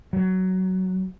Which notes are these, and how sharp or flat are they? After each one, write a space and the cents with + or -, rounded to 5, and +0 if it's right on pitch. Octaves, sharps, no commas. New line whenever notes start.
F#3 +10